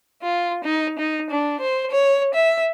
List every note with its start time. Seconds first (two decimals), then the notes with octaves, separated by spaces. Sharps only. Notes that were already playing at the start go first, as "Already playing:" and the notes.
0.22 F4
0.63 D#4
0.98 D#4
1.30 D4
1.60 C5
1.89 C#5
2.34 E5